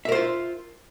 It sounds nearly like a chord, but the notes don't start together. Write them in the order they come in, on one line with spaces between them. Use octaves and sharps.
E5 A#4 C5 F4